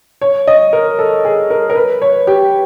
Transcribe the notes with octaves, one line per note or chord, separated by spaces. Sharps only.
C#5
D#5
A#4
A4
G#4
A#4
A#4
B4
C#5
G4